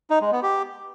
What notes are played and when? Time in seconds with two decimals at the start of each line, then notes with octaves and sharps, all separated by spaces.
0.10 D#4
0.21 G#3
0.32 B3
0.43 G4